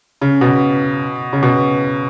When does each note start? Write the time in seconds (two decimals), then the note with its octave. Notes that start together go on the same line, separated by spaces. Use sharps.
0.22 C#3
0.41 B2
1.33 C#3
1.43 B2